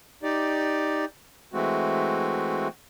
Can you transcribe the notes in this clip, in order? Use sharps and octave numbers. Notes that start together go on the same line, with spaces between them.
D#4 G4 D5
E3 G#3 A3 C4 F#4